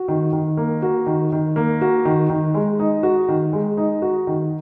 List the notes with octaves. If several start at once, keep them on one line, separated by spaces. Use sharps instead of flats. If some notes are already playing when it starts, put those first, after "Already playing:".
Already playing: F#4
D#3
D#3
A#3
F#4
D#3
D#3
A#3
F#4
D#3
D#3
G#3
D#4
F#4
D#3
G#3
D#4
F#4
D#3